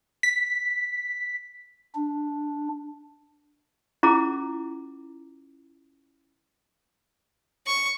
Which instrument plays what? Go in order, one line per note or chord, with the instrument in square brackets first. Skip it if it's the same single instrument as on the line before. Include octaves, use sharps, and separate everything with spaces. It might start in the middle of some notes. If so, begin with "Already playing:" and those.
[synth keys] B6
[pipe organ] D4
[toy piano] C#4 E4 F4 G#4 A#5 D6
[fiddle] C#6